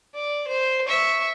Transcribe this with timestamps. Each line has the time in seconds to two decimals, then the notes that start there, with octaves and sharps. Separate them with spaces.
0.14 D5
0.48 C5
0.87 E5 C#6